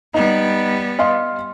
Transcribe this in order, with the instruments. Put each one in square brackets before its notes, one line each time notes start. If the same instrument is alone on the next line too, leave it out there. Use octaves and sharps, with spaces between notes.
[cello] G3 B3 [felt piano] D#4
[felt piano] D#5 F5 C6